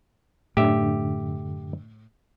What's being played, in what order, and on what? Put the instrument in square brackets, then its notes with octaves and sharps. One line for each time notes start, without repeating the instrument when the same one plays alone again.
[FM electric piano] F#2 D3 [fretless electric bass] A2 [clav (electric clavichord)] G4 E5